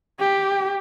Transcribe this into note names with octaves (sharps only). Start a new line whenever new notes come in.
G4